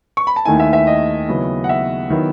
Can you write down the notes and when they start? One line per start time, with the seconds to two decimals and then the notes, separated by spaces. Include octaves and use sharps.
0.17 C#6
0.27 B5
0.36 A5
0.45 D#2 D#3 A3 E4 G#5
0.60 E5
0.73 E5
0.87 D#5
1.28 D#2 C#3 F#3 B3 E4
1.64 F#5
1.69 E5
2.10 D#3 F#3 B3 E4